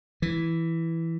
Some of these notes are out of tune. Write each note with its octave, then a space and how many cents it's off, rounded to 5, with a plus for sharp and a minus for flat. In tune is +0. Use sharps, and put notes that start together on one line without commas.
E3 +0